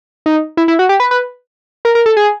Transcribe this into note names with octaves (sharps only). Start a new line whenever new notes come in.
D#4
E4
E4
F#4
G4
B4
B4
A#4
A#4
A4
G#4